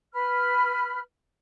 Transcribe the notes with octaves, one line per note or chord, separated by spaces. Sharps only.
B4 B5 F6